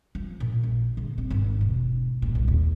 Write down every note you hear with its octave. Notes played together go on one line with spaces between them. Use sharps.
F3
A#2
A#1
D3
C4
G#1
E1
A#2
C2
D#2